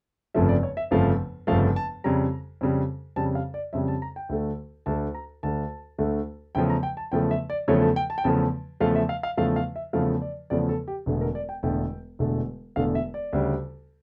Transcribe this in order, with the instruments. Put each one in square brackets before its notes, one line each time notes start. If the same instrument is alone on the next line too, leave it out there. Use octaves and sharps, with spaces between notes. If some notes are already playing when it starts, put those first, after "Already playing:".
[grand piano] G1 F2 C#3 F3 A3 E5
D5
C#5
E5
G1 F2 C#3 F3 A3 F5
G1 F2 C#3 F3 A3 F5
A5
F2 C#3 G3 A#5
F2 C#3 G3
F2 C#3 G3 A5
F5
D5
F2 C#3 G3 E5
A5
A#5
G5
D2 D3 A3
D2 D3 A3 A5
A#5
D2 D3 A3 A5
D2 D3 A3
E2 C#3 F3 A3 G5
A#5
G5
A5
E2 C#3 F3 A3 G5
E5
D5
E2 C#3 F3 A3 C#5
A4
G5
A5
G5
E2 C#3 F3 A3 A5
E2 C#3 F3 A3 F5
E5
F5
F5
E2 C#3 F3 A3 F5
F5
E5
E2 C#3 F3 A3 F5
D5
E2 C#3 F3 A3 D5
A4
G4
E1 E2 D3 A3
A#4
D5
G5
E1 E2 D3 A3 G5
E1 E2 D3 A3
E1 E2 D3 A3 F5
E5
D5
D2 C#3 G3